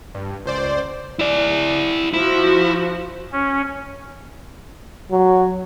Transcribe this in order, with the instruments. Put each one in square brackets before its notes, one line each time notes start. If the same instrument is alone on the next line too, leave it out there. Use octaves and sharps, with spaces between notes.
[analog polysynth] G2
C#2 C5 D5
[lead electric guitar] E4 D5
[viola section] F3 F#4 [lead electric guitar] E4
[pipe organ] C#4
[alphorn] F#3